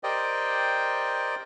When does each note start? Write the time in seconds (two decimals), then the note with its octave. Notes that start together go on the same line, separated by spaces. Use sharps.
0.03 G4 A#4 C5 D5 D#5 G5